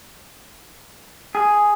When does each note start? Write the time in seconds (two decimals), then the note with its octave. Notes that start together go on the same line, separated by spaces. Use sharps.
1.35 G#4